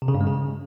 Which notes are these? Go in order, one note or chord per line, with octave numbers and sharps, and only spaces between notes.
C3
C#3
G2
G#3
C#3